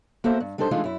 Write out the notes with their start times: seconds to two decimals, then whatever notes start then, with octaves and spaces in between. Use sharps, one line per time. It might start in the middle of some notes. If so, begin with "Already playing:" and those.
0.24 A#3 F#4 A4 C5 E5
0.40 G2
0.58 G3 D4 D#4 A4 C5
0.71 E3 G#3 A3 D4 D#4 F4
0.84 F#2 E4